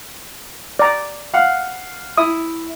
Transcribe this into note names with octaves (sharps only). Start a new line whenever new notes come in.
D5 A#5
F5 F#5
E4 D#6